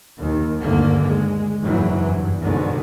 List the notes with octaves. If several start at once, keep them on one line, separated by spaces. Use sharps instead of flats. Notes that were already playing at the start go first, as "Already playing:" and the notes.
D#2 D#3
G1 D2 D3 D#3 A#3
G#3
F#1 E2 G#2 E3 F#3
G2
C#2 G#2 B2 D3 D#3